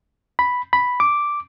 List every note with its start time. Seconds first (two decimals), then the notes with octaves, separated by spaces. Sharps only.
0.39 B5
0.73 B5
1.00 D6